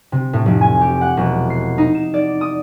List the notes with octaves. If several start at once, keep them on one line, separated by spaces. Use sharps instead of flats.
C3
A2
F1
G#5
G4
F#5
E1
C7
D#4
E7
D5
D#6